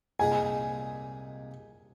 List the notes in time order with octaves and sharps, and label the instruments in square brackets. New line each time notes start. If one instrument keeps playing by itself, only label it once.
[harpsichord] C2 A#2 G#3 D#4 G#4 [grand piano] G#5